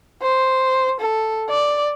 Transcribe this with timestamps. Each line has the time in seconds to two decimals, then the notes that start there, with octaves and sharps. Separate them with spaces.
0.22 C5
1.00 A4
1.50 D5